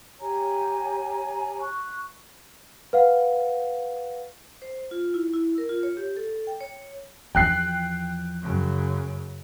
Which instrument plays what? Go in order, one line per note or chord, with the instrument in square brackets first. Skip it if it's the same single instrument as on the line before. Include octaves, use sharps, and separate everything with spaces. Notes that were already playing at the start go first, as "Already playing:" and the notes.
[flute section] G4 C#5 G#5 A#5
C#6 F#6
[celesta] B4 F5 F#5
[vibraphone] C5
F4
E4
E4
A#4
F4
C#5
G4
A4
G5
C#5
[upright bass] E2 F3 [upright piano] G5 F#6 C7
[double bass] F#2 C#3